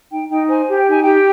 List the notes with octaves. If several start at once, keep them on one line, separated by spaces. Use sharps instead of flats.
D#4 G5
D#4 G5
C5 G#5
G4
G5
D#4 G#5
G4 G5